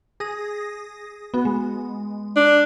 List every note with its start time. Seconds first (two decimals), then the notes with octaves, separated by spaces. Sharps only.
0.20 G#4 D#6 A#6
1.34 B3 F#4
1.45 G#3
2.36 D4